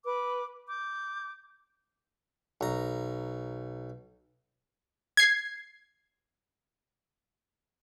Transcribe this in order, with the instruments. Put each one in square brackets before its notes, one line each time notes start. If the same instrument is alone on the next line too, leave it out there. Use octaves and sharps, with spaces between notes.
[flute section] B4 D6
D6 G6
[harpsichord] B1 A#5
[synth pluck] G#6 C7